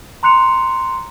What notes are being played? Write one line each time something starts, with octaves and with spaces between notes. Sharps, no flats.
A#5 C6 F#6 C#7 F7